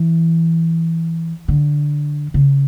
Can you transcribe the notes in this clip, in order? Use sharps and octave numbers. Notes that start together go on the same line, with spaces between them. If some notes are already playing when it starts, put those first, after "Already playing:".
Already playing: E3
D3
C#3